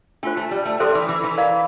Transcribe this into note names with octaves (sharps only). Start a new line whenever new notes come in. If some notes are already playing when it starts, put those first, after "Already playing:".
A3 D4 F4 C5
A3
G3
A3
G3 A4 C5 E5 A5 C6
E3
E3
E3
A#4 D5 F5 A#5